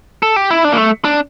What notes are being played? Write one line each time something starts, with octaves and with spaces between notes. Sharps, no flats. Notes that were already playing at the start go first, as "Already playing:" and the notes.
A4
G4
E4
D4
A#3
A3
D4